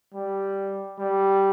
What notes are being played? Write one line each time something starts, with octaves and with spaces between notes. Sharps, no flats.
G3
G3